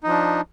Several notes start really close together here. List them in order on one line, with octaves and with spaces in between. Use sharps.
D#4 F3 D4